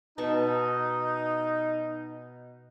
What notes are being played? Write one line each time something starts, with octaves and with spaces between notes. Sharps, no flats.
B2 D#4 A5 C#6